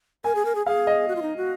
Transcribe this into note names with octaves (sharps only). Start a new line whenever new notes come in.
A#4 G#5
G#4
A#4
G#4
G#4 F5
D#5
F#4
F4
D#4
F#4